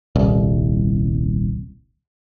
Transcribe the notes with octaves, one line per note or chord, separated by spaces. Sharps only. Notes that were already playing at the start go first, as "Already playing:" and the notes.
D#1 C2